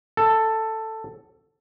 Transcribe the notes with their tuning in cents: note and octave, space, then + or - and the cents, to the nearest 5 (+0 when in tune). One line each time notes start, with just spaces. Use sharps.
A4 +10